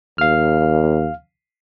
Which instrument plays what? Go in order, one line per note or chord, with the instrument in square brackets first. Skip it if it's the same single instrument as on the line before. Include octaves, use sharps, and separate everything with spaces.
[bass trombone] D#2 [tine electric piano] F5 F6